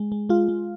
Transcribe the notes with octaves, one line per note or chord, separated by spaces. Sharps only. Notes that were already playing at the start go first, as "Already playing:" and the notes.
Already playing: G#3
G#3
G#3 F4
G#3